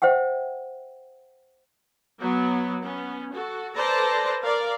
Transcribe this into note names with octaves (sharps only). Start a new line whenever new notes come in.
C5 E5 F#5 G5
F#3 B3
B3 C#4
F#4 A4
A4 B4 C5 D5 A5 A#5
A#4 D5 F5